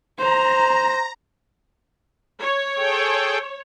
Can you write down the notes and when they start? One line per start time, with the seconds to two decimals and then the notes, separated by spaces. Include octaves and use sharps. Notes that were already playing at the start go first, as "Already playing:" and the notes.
0.18 C5 A#5
2.41 C#5
2.77 G#4 A4 G5